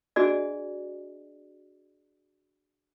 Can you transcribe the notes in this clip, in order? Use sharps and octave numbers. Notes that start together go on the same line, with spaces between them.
D4 F#4 G#4 D5 D#5